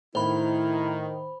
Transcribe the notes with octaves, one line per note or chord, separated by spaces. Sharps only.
A2 D#3 E4 C5 B5